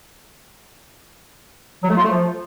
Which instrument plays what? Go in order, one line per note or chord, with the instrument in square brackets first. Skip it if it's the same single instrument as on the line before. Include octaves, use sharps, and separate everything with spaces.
[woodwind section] F#3
A3
F4
A3
F3